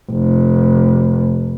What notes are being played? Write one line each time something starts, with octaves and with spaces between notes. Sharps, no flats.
F1